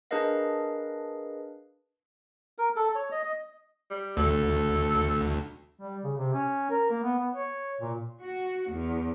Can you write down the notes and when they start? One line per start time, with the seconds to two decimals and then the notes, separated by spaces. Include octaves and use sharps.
0.11 D4 G#4 A#4 B4 D#5 F5
2.58 A#4
2.76 A4
2.95 C#5
3.11 D#5
3.23 D#5
3.90 G3
4.17 D2 A4
5.80 G3
6.04 C#3
6.17 C3
6.33 C#4
6.70 A#4
6.90 A#3
7.03 B3
7.18 B3
7.34 C#5
7.81 A#2
8.21 F#4
8.72 E2